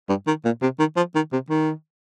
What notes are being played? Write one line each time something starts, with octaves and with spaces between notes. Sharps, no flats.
G2
D#3
A#2
C3
D#3
F3
D#3
C3
D#3